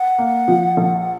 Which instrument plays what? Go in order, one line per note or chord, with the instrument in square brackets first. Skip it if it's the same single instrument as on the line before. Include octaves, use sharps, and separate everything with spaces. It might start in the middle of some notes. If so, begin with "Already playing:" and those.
Already playing: [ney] F#5
[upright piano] A#3
F3
A#1